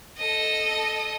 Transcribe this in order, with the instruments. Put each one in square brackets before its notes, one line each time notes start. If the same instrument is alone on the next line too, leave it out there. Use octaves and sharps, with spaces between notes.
[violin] A4 D#5